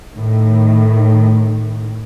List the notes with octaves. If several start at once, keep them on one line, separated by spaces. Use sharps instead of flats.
A2 D#3